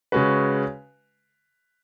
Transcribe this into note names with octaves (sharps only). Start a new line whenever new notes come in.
C#3 G#3 C#4 F#4 B4